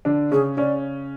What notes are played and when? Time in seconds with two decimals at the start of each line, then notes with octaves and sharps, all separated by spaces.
0.05 D3 D4
0.31 C#3 C#4 G#4
0.57 C#3 C#4 D5